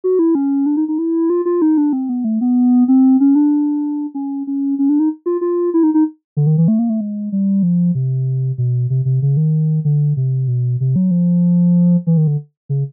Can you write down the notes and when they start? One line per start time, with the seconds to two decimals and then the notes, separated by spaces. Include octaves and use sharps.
0.04 F#4
0.19 E4
0.35 C#4
0.66 D4
0.77 D#4
0.88 D#4
0.99 E4
1.30 F4
1.46 F4
1.62 D#4
1.78 D4
1.93 C4
2.09 B3
2.24 A3
2.41 B3
2.88 C4
3.20 C#4
3.35 D4
4.15 C#4
4.47 C#4
4.79 C#4
4.89 D4
4.99 D#4
5.26 F4
5.41 F4
5.74 E4
5.83 D#4
5.94 D#4
6.37 D3
6.47 D#3
6.58 E3
6.68 A3
6.79 A#3
6.89 A3
7.01 G#3
7.32 G3
7.63 F3
7.95 C3
8.58 B2
8.90 C3
9.05 C3
9.22 C#3
9.37 D#3
9.85 D3
10.17 C3
10.48 B2
10.81 C3
10.96 F#3
11.11 F3
12.07 E3
12.17 D#3
12.27 D3
12.69 C#3